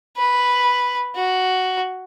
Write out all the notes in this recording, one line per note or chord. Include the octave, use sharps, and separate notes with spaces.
B4
F#4